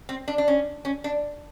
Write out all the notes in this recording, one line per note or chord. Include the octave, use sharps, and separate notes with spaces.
C4
D4
D4
C#4
C#4
D4